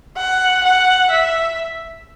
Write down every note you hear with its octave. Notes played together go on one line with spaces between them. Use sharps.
F#5
F#5
E5